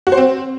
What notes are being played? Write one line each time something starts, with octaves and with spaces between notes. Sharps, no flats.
F#4
C5
C4